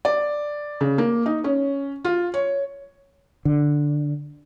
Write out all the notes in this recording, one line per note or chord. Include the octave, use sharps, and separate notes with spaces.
D5
C#3
A#3
D#4
C#4
F4
C#5
D3